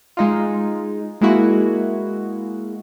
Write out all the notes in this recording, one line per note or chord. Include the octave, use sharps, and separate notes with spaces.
G#3 D#4 F4
G#3 A#3 E4 F#4